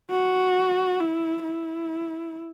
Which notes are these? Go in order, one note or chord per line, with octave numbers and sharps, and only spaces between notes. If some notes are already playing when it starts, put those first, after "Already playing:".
F#4
E4
E4